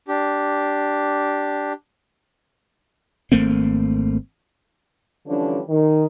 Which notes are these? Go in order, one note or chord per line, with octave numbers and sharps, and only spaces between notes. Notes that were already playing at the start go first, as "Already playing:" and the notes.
D4 G4
G#1 A3 A#3 C4
D3 E3 F3 G3 C#4 D4
D#3